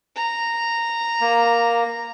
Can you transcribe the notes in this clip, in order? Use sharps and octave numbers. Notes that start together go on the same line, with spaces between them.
A#5
A#3